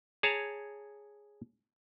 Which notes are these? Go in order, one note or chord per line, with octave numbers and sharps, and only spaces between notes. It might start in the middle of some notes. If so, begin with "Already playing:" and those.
G#4 C#5 A5 A#5